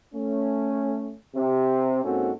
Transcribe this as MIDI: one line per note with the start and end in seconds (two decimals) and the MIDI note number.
0.14 1.14 57
0.14 1.14 61
1.35 2.00 48
2.03 2.32 44
2.03 2.32 58
2.03 2.32 60
2.03 2.32 61
2.03 2.32 66
2.03 2.32 69